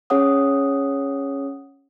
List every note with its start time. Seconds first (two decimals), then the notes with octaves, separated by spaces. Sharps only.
0.10 C#4 G#4 C#5 F#5 D#6